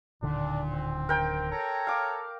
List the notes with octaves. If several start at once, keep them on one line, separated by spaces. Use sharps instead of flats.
D1 A#2 D3 D#3 D4
C4
A#4 G5
A4 C#5 A#5
F5 D6